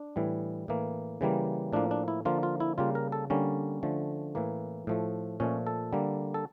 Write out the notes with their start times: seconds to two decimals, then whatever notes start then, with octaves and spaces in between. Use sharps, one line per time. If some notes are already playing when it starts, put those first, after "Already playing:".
Already playing: D4
0.16 A2 E3 G3
0.68 A2 E3 A#3
1.21 C#3 E3 G3 A#3
1.73 A2 F3 A#3 D4
1.91 D4
2.08 E4
2.25 D3 F3 A#3 F4
2.43 F4
2.60 E4
2.78 C#3 G3 A#3 F4
2.95 A#4
3.12 A4
3.30 D3 G3 A#3 C#4
3.83 D3 F3 A3
4.35 A2 E3 A#3
4.87 A2 F3 A3
5.40 A#2 F3 A3 C#4
5.67 A4
5.93 D3 G3 A#3
6.34 A4